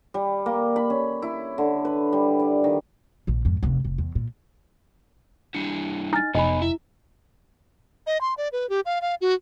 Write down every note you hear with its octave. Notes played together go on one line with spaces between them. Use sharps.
G3
A#3
B5
C#4
E4
D3
B4
G3
D5
D#3
A#1 D#3
F2 G#2
F1 D2
F1
E2
A#2
G3 D4 E4 C#7
D#4 G#5 F6 A6
F1 B3 D#4 D#5 G#5 B5
E4 E5
D#5
C6
D5
B4
G4
F5
F5
F#4